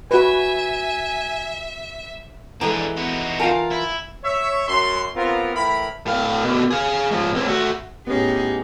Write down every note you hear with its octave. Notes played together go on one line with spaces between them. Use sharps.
F#4 B4 E5 G#5
E3 G#3 D4 G#4 A4 F#5 A#5
D#4 F#4
F4 A#4 F#5 G#5 A5
E4
C#5 E5
F#2 C6
B3 C4 F4 G4 A#4
A2 E3 E4 A#4 B5
A2 F5
B2 D3
G#4 F5
G#2 F3
C#2 C4
A3 F#4
A2 B3 C#4 D#4 G4 G#4